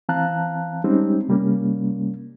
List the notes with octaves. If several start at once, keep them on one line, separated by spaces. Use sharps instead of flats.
E3 C4 F5 A5 A#5 F#6
G3 G#3 C4 C#4 D#4 G4
C3 G3 A#3 C#4